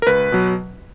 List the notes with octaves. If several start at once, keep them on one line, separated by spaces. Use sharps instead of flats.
A#4
C#2 B4
B2 F#3